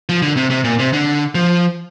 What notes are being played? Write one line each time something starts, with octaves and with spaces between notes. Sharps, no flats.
F3
D3
C3
C3
A#2
C3
D3
F3